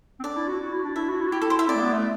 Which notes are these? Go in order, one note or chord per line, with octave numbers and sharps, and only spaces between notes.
C4
D4 D5
E4
F#4
F#4
E4
D4
E4 E5
F#4
E4
F#4
E4 G4
A4
C5
E5
C4 D5
A3
B3
A3